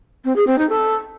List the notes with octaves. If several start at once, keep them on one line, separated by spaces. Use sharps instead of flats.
C4
G#4
C4
D#4
A4